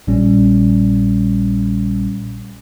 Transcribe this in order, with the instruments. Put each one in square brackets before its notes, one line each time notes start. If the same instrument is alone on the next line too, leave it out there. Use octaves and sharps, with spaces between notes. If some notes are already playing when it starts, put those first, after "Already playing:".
[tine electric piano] A#1 A#2 G3 C#4